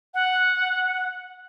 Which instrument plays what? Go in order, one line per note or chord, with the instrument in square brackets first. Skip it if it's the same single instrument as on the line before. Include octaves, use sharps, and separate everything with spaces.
[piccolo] F#5